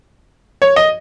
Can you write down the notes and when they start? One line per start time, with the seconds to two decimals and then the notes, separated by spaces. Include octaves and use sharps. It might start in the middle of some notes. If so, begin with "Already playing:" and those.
0.62 C#5
0.76 D#5